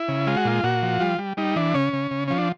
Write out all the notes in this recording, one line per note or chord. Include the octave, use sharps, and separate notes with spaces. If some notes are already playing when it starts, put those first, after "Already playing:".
Already playing: E4
C#3
G#3 F4
F#4
A#2 F4
A#2 F#4
F3
G3 F4
G3
G3 D#4
E3 D4
C#3 C#4
C#3
C#3
F3 C#4
D4